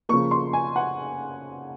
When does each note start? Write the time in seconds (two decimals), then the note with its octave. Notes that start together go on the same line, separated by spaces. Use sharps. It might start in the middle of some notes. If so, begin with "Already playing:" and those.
0.09 C#3 F3 A#3 C#6
0.31 C6
0.53 G#5
0.76 F#5